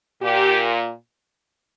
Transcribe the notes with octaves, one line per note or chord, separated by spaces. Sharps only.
A#2 G4